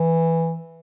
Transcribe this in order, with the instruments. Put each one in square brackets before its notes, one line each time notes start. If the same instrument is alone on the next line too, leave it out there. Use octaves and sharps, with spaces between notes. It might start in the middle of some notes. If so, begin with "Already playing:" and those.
Already playing: [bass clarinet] E3